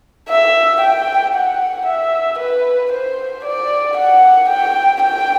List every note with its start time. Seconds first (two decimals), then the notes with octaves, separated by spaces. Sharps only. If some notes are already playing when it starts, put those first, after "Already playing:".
0.29 E5
0.81 G5
1.34 F#5
1.87 E5
2.39 B4
2.92 C5
3.45 D5
3.97 F#5
4.49 G5
5.02 G5